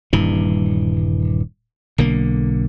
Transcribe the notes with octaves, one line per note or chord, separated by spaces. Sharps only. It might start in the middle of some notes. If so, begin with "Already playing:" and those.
D#1 G2 E3
B1 D3 A#3